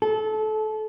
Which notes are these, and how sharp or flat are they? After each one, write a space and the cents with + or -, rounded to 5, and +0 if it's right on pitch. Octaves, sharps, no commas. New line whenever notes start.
A4 -25